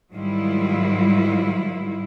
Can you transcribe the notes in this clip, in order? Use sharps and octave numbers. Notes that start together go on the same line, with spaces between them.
G#2 D#3 F#3 G3 E4 F4